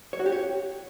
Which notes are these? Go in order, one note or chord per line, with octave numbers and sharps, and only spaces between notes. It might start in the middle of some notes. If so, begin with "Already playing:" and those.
C#5
F#4
G4
C#5